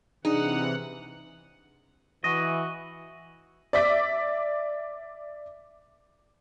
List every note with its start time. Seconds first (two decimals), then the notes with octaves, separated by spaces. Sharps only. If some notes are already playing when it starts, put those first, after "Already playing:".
0.25 C3 E3 D4 D#4 G#4 F#5
2.24 E3 F#4 D#5
3.73 D5 E5 D6 B6